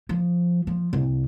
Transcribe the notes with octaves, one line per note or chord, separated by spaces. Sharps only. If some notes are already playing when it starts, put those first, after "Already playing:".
F3
F3
C2